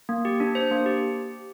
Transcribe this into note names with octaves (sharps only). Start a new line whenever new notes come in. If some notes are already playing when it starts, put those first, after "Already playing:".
A#3
G4
D4
C5
A#3
G4